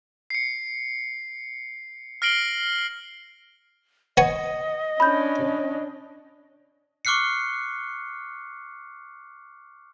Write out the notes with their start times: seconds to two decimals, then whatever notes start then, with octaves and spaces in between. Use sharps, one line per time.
0.30 C7 C#7
2.22 F6 A#6 C7 D7 F#7 G7
4.17 B3 C#5 D#5 G#5
5.00 C#4 D4 B5 G6
7.05 C#6 D6 F6 F#6 C7 C#7